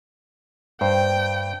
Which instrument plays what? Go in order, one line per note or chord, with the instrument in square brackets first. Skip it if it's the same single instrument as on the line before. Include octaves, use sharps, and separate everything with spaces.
[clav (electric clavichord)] G2 [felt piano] C5 [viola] G5